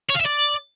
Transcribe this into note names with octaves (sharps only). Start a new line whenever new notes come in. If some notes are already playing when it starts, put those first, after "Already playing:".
C#5
F5
E5
D5